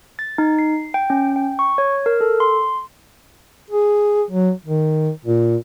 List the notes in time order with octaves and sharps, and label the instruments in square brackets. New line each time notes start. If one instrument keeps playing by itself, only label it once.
[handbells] A6
D#4
C7
G5
C#4
G5
C#6
C#5
A#4
A4
C6
[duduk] G#4
F#3
D#3
A#2